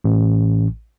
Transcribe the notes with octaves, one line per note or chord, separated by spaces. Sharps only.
A1